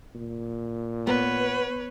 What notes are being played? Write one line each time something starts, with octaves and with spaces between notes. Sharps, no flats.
A#2
B3 B4 C#5